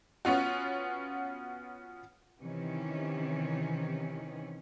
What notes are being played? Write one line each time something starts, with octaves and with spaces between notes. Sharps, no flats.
B3 C#4 F4 F#4
C3 D#3 E3 C#4